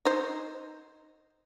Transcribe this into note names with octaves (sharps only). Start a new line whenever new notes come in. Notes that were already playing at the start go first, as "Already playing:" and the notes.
D#4 C5